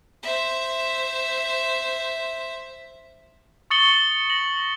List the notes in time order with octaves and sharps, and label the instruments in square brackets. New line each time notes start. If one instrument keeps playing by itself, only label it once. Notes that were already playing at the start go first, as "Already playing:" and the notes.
[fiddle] C5 E5
[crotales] C#6 D#6 A6 C#7 F#7 G7
A#6 F#7